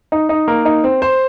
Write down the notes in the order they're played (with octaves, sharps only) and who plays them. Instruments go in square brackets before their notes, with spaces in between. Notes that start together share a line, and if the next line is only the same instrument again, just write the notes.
[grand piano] D#4
D#4
A#3
D#4
C4
C5